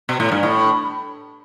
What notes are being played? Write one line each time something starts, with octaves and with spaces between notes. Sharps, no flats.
B2
A2
G2
A2